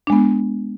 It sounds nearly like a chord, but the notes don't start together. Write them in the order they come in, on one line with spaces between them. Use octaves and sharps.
D4 G#3 B3